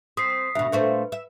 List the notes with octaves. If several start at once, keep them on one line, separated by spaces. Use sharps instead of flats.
C4 D#6 B6 C7
D#6
D2 B2 E5
A#2 A3 B4 C5
E5